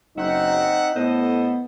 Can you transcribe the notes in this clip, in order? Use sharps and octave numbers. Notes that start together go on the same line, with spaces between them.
F#1 F#3 C4 D#4 E5 F#5
A2 B3 A4 C5 D#5